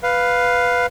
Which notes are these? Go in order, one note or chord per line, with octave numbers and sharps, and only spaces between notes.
B4 F5